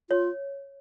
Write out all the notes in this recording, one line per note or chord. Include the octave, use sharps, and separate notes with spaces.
F4 C#5